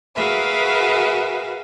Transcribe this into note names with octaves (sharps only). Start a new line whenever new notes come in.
F#4 G#4 A#4 B4 E5 F5